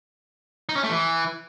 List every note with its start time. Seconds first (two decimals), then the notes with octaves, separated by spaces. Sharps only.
0.69 D#4
0.76 C#4
0.83 A3
0.91 E3